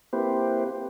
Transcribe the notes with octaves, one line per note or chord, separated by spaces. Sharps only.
A#3 C4 E4 G4 B4 C5